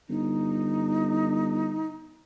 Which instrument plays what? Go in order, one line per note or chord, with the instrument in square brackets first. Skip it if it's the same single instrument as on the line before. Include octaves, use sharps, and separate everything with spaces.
[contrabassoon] G1 [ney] D#4